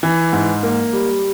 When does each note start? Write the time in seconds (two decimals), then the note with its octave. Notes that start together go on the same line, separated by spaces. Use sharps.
0.03 E3
0.33 G#2
0.63 A#3
0.93 G3